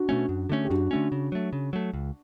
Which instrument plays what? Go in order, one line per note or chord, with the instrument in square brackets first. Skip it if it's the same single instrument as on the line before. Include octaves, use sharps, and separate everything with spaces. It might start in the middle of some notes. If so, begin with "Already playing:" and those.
Already playing: [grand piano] D4 F#4
[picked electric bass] B2 A3 C#4
F#2
D3 A3 C#4
[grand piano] G4
[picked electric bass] F#2 [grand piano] D4 F#4
[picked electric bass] D3 A3 C#4
C#3
F#3 A3
C#3
F#3 A3
C#2